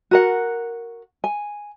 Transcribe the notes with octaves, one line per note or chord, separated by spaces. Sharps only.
F#4 A#4 F#5
G#5